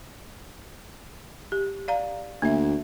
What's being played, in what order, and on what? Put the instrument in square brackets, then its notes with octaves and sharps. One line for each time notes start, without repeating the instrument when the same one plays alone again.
[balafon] G4
D5 F5 A#5
[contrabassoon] D2 [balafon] A#3 E5